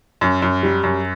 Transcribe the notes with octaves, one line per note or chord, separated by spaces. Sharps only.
F#2
F#2
G3
F#2